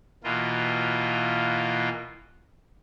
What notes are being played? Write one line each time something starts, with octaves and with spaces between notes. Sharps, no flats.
B2 E3 A#3 F4